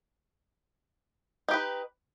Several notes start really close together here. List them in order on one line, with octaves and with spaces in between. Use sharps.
D#4 G4 B4